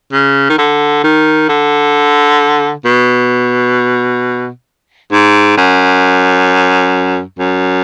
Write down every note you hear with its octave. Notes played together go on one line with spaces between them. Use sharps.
C#3
D#3
D3
D#3
D3
B2
G#2
F#2
F#2